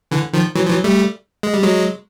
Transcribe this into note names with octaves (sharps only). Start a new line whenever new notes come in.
D3 E3
D#3 F3
E3 F#3
F3
E3 F#3
G3 A3
G#3
G3
F#3 G#3